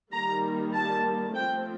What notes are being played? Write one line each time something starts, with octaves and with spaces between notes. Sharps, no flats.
D#3 G3 A#3 A#5
A5
F3 A3 C4 G5